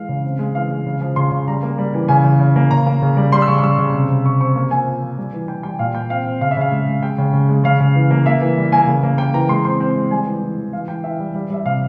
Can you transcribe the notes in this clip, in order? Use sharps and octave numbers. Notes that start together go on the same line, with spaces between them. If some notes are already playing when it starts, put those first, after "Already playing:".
Already playing: E3 G#3 F5
C#3
C4
G#3
E3 F5
G#3
C#3
F3
C#3 C6
C#3
G3 A#5
A#3
G3
E3
C#3 G#5
C#3
C#3
A#3
C#3 A#5
A#3
C#3
G3
G3 C6
E6
C#3 C#6
C#6
G3 E6
C#3
C3
C3
C3 C#6
C4 C#6
A#3
F3 G#5
F3
F3
G3
E3
E3 G5
G3 G5
A#2 F5
A#2 G5
C4 F5
C4
C#3 F5
E5
C#3 F5
G#3
G#3
G#3 G5
C#3
C#3
G#3
C#3 F5
C#3
E3
A#3
A#3 E5
E3
G3
A#3 G#5
C#3
A#3
A#3 G5
E3 A#5
G#3 C6
C4 C6
C4
G#3
G3 G#5
E3
E3
E3
E3 F5
E3 G5
E3 E5
G3
G3
G3 E5
C3 F5